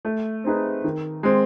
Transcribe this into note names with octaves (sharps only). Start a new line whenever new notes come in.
A3
C4 D#4 G#4 B4
D#3
G#3 C4